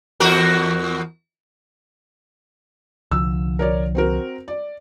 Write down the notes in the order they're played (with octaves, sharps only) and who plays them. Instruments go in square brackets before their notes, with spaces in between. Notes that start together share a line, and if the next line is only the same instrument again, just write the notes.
[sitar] E2 F#4 A#4
[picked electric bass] C2 D3 F3 [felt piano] E6
[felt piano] A#4 C#5 D5
C4 F#4 A#4
D5